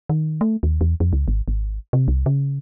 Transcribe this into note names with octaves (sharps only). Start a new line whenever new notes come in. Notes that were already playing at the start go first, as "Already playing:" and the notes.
D#3
A3
D#2
E2
F2
C#2
G#1
G#1
C3
C2
C#3